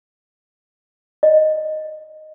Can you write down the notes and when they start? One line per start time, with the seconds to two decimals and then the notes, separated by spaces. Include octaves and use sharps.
1.23 D#5